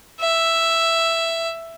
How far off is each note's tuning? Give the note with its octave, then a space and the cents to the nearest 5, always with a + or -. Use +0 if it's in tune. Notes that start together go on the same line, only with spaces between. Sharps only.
E5 +5